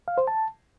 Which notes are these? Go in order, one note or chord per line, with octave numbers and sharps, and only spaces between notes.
F5
C5
A5